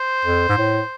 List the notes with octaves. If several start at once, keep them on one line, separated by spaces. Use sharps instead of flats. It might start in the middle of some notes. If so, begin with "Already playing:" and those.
Already playing: C5
F2
G#2
A2